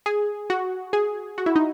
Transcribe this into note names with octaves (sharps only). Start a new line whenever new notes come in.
G#4
F#4
G#4
F#4
E4
D#4